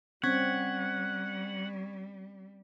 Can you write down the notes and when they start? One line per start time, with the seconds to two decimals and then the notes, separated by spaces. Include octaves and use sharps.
0.24 G3 C4 C#4 F#5 C#6 G#6 B6